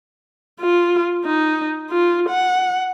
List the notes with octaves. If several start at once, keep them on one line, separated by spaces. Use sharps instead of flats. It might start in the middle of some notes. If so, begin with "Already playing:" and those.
F4
D#4
F4
F#5